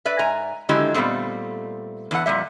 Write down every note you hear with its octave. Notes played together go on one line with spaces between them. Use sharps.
B4 D5 E5
G#2 G#5 A#5
D3 D#3 F#3 G#3 E4 G4
A#2 G3 A3 B3 C4
E2 E3 D#4 F#5
F2 A#2 G3 E5